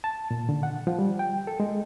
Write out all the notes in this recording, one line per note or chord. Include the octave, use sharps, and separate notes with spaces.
A5
A#2
D3
F#5
F3
G3
G5
A4
G#3